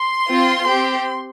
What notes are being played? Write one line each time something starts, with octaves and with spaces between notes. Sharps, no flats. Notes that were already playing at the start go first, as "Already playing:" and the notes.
Already playing: C6
C4 F4
C4 G4